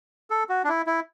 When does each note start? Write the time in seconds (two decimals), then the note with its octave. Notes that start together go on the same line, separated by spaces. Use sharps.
0.30 A4
0.49 F#4
0.64 D4
0.68 E4
0.87 E4